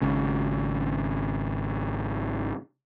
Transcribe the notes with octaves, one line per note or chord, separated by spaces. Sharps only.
G#1 G#2 C#3